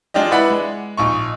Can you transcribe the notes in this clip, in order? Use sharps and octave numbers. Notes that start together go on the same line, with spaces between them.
G#3 D4 F4 G4 D#5
E4 B4 D5 F#5 B5
G#3
A#1 D#4 C#6